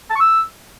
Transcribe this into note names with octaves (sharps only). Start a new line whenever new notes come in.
A5
C#6
E6